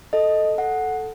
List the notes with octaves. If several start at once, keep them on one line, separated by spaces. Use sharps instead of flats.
A4 D#5
A4 F#5